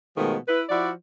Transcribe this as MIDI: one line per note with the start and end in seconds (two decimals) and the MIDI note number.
0.17 0.36 47
0.17 0.36 51
0.17 0.36 53
0.17 0.36 56
0.17 0.36 57
0.47 0.62 64
0.47 0.62 71
0.69 0.90 53
0.69 0.90 64
0.69 0.90 66
0.69 0.90 74